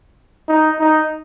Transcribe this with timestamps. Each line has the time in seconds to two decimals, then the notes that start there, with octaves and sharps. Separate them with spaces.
0.48 D#4
0.79 D#4